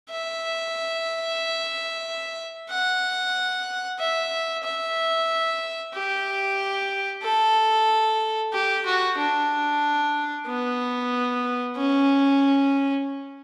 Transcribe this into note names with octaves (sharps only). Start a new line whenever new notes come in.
E5
F#5
E5
E5
G4
A4
G4
F#4
D4
B3
C#4